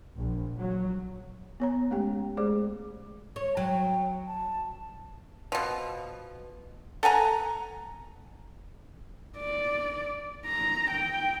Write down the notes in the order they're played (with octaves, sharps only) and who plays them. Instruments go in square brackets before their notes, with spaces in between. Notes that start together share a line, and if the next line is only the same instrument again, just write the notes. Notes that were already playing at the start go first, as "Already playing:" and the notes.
[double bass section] A#1
F#3
[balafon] B3 C#5 A#5
G#3 A3 C#4 G4 G5
G#3 G#4 C5 D5 D6
[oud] C#5
[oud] F#3 [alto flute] G5
[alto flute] A5
[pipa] B2 F3
A4 F#5 G#5 A#5
[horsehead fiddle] D5
A#5
G5